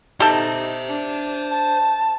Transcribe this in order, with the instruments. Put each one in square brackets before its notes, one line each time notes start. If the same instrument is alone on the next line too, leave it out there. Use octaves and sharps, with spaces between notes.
[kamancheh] D#4 [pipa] G4 A4 [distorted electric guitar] C5 E5
[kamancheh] D4
[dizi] A5